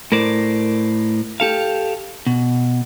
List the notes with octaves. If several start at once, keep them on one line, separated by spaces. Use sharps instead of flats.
A2 A#4 C5 D5
G4 A4 F5
B2